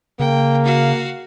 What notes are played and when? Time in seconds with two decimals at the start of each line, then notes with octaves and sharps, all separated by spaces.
0.19 C#3 A#3 G5
0.65 F#4 F5